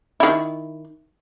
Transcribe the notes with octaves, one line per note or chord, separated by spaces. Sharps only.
D#3 E4